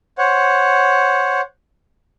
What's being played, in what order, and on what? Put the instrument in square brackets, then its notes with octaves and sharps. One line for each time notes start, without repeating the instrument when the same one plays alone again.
[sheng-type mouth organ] C5 C#5 F#5